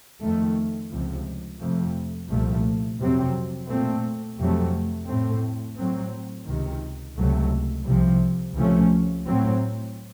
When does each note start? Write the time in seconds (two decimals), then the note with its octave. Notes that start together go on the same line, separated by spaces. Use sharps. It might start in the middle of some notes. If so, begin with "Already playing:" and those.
0.20 F2 D#3 A3
0.90 C#2 C3 F3
1.59 F2 C3 F3 A3
2.28 C2 A#2 F3 A3
2.98 F2 C3 F#3 C4
3.68 A#2 A3 C4
4.37 F2 C3 F#3 A3
5.07 A2 A3 C4
5.77 A2 F#3 C4
6.47 C#2 C3 D#3
7.16 C#2 C3 F#3 A3
7.85 C2 C3 F3
8.55 C#2 C3 F3 A3 C#4
9.25 A2 F#3 C4